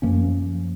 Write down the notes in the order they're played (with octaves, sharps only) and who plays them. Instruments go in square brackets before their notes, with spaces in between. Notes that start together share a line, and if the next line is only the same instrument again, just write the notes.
[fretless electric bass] F#2 F3 A#3 C#4